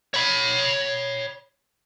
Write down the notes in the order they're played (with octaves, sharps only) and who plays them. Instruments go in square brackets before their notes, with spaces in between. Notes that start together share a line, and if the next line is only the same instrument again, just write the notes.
[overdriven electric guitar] C#5 B5